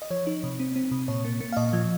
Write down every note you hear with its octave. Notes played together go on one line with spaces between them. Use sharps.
D#5
F3 C#5
D#4
C3
C4
C4
C3
A#2 C#5
A#3
A#3
F5
A#2 D#5
F3